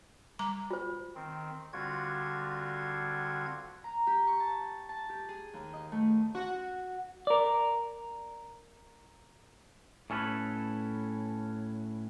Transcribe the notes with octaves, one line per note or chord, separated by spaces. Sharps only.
G3 A#5 D6
F4 C5
D#3 C4
D3 G3 C4 F4 F#4 G#6
A#5
G4
C#6
A5
A5
G4
G#4
D#2
D#5
A3
F#4
A#4 D5
A2 C#4 A4 B4